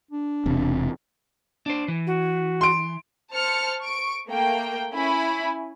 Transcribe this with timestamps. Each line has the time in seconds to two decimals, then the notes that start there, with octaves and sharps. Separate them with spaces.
0.11 D4
0.46 E1 C3
1.66 D4 C5
1.88 E3
2.07 F#4
2.61 C6 D7
3.34 C5 A5 F6 C#7
3.82 C#6 D7
4.28 A3 A#3 G5
4.94 C#4 E4 G#5 B5